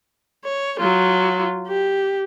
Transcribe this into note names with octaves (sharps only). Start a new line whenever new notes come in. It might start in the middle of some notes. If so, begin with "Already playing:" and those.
C#5
F#3 F4
G4